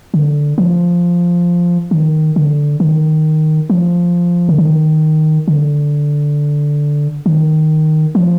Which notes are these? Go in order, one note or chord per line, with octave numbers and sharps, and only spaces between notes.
D3
F3
D#3
D3
D#3
F3
D3
D#3
D3
D#3
F3